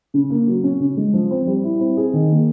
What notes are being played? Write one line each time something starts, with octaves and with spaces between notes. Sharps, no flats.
C#3
A#3
F#3
C#4
C#3
G#3
F3
C4
G3
E4
C4
G#4
D#3
A#3